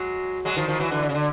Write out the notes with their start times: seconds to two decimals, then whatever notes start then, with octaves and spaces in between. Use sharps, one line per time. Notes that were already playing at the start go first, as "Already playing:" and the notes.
Already playing: F#3 G#3
0.45 F#3 G#3
0.56 D#3 F3
0.68 D#3 F3
0.80 E3 F#3
0.91 D3 E3
1.03 D3
1.09 C#3
1.15 D3